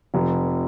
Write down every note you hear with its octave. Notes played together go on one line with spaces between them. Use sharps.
F1